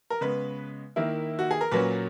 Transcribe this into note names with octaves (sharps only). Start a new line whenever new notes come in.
A#4
C#3 G#3 B3 B4
D#3 A#3 E4
F#4
G#4
A#4
A#2 F#3 A#3 C#4 B4